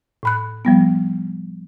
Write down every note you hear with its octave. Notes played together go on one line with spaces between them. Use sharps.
A2 B5 F#6
F3 G3 B3